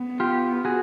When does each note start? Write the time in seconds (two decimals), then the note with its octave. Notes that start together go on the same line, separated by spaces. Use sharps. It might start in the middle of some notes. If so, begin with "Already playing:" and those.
Already playing: B3
0.20 F4 G4
0.65 F#4 G#4